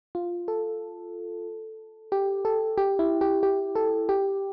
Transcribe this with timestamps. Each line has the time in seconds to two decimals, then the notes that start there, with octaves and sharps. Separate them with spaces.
0.15 F4
0.48 A4
2.12 G4
2.45 A4
2.78 G4
2.99 E4
3.21 G4
3.43 G4
3.75 A4
4.09 G4